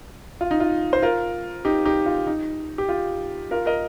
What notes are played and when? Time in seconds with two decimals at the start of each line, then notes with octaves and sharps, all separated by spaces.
0.41 F4
0.51 D#4
0.60 F4
0.93 C5
1.03 F4 A#4
1.65 D#4 G4
1.85 D#4 G4
2.06 F4
2.27 D#4
2.78 G4
2.89 F4
3.51 F4 A#4
3.66 A#4 D#5